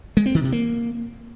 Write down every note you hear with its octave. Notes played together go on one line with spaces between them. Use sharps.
G#3
C4
D#3
C3
A#3